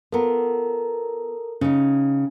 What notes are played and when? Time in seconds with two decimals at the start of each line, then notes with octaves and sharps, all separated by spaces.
0.12 B3 F4 A4 A#4 A#5
1.61 C#3 C#4 D#4